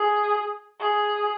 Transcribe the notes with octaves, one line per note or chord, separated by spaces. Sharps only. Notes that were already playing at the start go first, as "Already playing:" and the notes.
Already playing: G#4
G#4